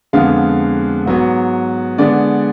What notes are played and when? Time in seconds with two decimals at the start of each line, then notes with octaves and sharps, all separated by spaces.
0.13 F2 D3 G#3 B3 F5
1.06 G#2 F#3 B3
1.98 D3 G#3 B3 D5